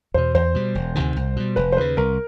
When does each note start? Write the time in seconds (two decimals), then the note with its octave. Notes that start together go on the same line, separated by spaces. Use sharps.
0.14 E2 B2 C5
0.35 E2 C5
0.54 B2 G3
0.75 E1
0.95 D2 C3 D#3
1.16 C2
1.36 B2 G3
1.56 F1 B4
1.72 C5
1.77 D#2 C#3 B4
1.97 C2 A#4